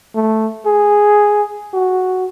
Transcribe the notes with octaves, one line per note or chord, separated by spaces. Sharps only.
A3
G#4
F#4